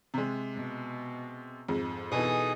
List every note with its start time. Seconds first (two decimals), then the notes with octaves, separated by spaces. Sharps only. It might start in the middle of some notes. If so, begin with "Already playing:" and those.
0.14 C3 G#3
0.55 B2
1.68 F2 G#2 G#3
2.12 B2 E3 D#4 G#4 A4 D#6